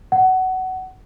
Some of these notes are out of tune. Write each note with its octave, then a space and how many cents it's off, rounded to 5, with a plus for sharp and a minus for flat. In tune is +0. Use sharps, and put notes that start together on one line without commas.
F#5 +20